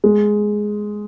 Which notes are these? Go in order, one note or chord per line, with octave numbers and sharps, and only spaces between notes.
G#3